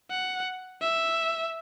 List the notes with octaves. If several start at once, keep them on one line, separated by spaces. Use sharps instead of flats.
F#5
E5